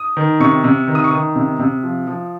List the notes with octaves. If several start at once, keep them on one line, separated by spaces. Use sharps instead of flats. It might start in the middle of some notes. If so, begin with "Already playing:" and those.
Already playing: D#6
D#3
C3 C#6
C3
D#3
D#6
C#6
D#3 D#6
C3
C3
F3
F3